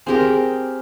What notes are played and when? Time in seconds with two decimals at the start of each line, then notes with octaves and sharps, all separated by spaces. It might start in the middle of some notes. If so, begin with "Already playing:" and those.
0.06 C4 G4 G#4 A#4